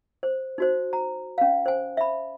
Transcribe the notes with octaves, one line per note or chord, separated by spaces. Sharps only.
C5
D#4 F#4 C5
A#5
C#4 F5
C5 G#5
E5 B5